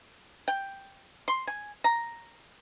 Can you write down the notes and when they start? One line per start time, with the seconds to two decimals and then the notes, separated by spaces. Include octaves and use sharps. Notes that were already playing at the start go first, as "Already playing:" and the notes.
0.48 G5
1.28 C6
1.47 G#5
1.84 A#5